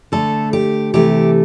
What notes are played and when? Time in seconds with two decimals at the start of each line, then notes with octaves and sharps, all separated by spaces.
0.12 D3 A3 A4
0.53 G4
0.94 C3 E3 A3 G4